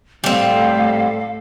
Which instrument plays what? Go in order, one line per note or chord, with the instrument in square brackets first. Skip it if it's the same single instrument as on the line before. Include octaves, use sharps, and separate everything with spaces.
[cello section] A2 A3 A4 [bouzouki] G3 C4 [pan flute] F5